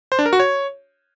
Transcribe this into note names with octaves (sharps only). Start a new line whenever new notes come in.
C5
D4
A#4
F#4
C#5